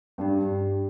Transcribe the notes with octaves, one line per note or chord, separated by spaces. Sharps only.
G2 G4 D5 G5